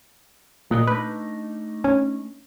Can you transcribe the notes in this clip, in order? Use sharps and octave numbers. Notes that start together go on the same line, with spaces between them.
A#2 B3 A#4 D#5
A3 D4 D#4 B4
C#4